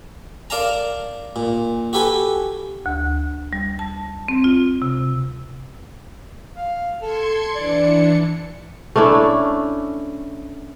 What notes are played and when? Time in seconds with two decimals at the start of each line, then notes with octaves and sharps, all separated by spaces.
0.50 A#4 D5 F5 A5 A#5
1.36 A#2
1.93 F#4 G4 A4 B4 G#5
2.86 D2
3.53 G3
3.79 A5
4.28 C4
4.44 F4
4.82 C3
6.56 F5
7.02 A4 C6 G#6 C#7
7.55 E3 D4 D5 C#7
8.96 A3 C#4 D4 E4